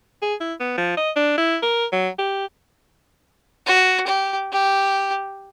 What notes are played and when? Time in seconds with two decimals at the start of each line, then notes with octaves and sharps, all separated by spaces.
0.22 G#4
0.40 E4
0.60 B3
0.77 F3
0.97 D#5
1.16 D4
1.37 E4
1.62 A#4
1.92 F#3
2.18 G4
3.66 F#4
4.07 G4
4.52 G4